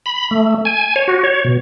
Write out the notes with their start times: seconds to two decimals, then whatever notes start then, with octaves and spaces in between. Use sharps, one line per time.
0.06 B5
0.31 A3
0.65 G#5
0.96 C#5
1.08 F#4
1.24 C#5
1.44 B2